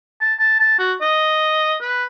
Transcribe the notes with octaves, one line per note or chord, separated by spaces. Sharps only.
A5
A5
A5
F#4
D#5
B4